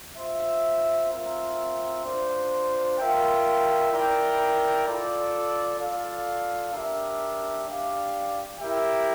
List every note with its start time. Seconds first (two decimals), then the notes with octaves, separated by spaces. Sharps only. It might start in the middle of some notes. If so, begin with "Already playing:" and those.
0.17 F4 C5 E5
1.11 C4 F4 A#4 E5
2.04 D4 F4 C5
2.98 F4 A#4 E5 G5
3.92 E4 A#4 D5 G5
4.86 F4 A4 D5
5.79 F4 A4 D5 F5
6.73 D4 G4 A#4 E5
7.66 D4 G4 D5 F5
8.60 E4 G4 A#4 E5 G5